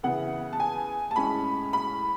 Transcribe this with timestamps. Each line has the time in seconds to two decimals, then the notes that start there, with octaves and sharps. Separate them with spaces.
0.03 C#3 E3 B3 E4 F#5
0.53 A5
0.60 G#5
1.11 A5
1.16 A2 G#3 C#4 B5
1.73 B5